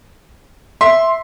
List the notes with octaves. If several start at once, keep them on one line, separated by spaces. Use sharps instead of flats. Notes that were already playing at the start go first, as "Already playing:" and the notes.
E5 C6